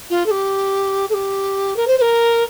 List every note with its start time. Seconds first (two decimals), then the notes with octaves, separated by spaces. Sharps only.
0.10 F4
0.26 A4
0.30 G4
1.09 A4
1.13 G4
1.76 A#4
1.87 C5
1.97 C5
2.01 A#4